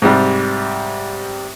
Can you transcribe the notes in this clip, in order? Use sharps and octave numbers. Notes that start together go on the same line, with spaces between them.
G#2 C3 G3